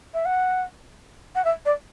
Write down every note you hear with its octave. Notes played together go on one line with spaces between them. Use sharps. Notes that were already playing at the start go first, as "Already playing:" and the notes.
E5
F#5
F#5
E5
D5